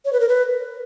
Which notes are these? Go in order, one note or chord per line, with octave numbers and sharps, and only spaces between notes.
C#5
B4
A#4
B4